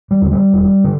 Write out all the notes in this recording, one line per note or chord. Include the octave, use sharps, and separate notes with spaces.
G3
D#2 D3
G3
E1
D3